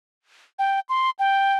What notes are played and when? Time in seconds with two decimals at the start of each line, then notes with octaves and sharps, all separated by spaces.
0.59 G5
0.89 C6
1.19 G5